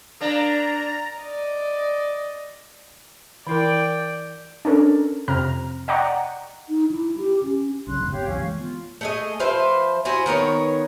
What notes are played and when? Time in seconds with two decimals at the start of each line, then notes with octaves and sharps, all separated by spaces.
0.21 A#3 D4 A#5
1.19 D5 D#5
3.47 E3 E4 A#4 D5 G5
4.65 C#4 D4 A4 A#4
5.28 F2 C3 A#5 F6
5.88 D5 D#5 F#5 G5 A#5 C#6
6.69 D#4
6.91 E4
7.18 G4
7.43 C#4
7.87 B1 C#3 B5 C6 F#6
7.99 F#1 E2 G#2
8.12 B2 B3 G4 C#5 F5
8.26 C2 F#2 E3 C#4 F5
8.40 E3 G#3 A3 C#6
8.58 B3 F4
9.01 A3 G#4 D#5
9.40 F3 B4 C5 E5
10.05 E4 F#4 G#4 C5
10.26 D#3 B3 A#4 C#5